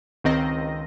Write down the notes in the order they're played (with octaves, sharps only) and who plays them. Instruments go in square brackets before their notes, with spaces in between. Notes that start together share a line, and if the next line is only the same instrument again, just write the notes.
[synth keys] C#2 D#3 C4 D#5 A#6